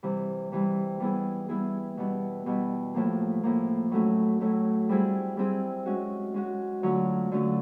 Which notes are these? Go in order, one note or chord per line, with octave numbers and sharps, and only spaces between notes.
C3 E3 G3
C3 E3 G3
G3 B3 E4 G#4
G3 B3 E4 G#4
B2 G3 B3 E4
B2 G3 B3 E4
A2 F3 A#3
A2 F3 A#3
A2 F#3 A3 C#4
A2 F#3 A3 C#4
G3 C4 E4 G#4
G3 C4 E4 G#4
G#3 C#4 F#4
G#3 C#4 F#4
D3 F#3 A3 C#4 F4
D3 F#3 A3 C#4 F4